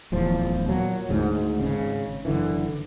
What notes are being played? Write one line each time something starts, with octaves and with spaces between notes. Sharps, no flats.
D1 E2 F3
A#2 F#3
G#1 D2 G#2
G#1 C#3
F#1 D3 E3